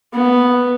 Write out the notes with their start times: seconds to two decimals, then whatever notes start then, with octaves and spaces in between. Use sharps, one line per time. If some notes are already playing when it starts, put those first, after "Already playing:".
0.13 B3